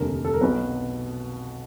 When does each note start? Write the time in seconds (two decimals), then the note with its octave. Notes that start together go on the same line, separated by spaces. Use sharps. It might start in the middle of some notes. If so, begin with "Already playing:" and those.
Already playing: F1 D#2 D3 A#4
0.25 A4
0.34 A#4
0.41 B1 B2 F#3 B4